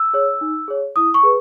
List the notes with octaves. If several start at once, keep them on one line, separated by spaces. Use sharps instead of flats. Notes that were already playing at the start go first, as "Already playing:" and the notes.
Already playing: E6
G#4 C#5
D#4
G#4 C#5
E4 D#6
C#6
G#4 B4